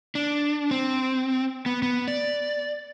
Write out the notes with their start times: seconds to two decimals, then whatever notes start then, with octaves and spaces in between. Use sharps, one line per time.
0.15 D4
0.71 C4
1.66 B3
1.82 B3
2.08 D5